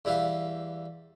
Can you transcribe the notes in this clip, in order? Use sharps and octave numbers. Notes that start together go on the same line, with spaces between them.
E2 G3 E4 B4 F5